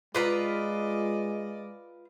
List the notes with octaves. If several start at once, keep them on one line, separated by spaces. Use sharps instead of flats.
G#3 F4 B4 D5 D#5 A#5